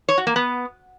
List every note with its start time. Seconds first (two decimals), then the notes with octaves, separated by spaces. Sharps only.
0.09 C#5
0.18 F#4
0.27 A#3
0.36 B3